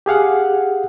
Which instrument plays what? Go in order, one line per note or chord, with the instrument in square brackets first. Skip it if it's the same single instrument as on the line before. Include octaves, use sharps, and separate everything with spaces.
[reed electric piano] G4 G#4 F5 F#5